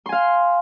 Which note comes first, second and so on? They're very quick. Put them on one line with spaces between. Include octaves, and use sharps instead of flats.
C6 G#5 F5